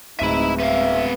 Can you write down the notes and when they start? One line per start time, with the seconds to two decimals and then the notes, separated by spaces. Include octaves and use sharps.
0.20 D1 G#3 C4 D#4 B4 E5 B5 D#7
0.60 B3 E5 F5